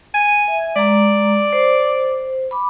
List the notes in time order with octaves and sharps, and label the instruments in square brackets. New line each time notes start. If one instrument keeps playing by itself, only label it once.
[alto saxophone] G#5
[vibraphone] E5
[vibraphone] G#3 A#5 [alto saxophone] D5
[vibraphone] C5
B5 D6